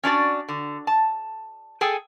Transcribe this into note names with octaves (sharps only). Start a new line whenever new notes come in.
C#4 D4 F#4 D5
D3
A5
G#4 A4 G5 G#5